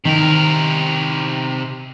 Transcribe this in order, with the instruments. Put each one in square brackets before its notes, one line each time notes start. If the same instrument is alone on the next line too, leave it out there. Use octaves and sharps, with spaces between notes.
[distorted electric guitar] C3 A#4 [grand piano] D#3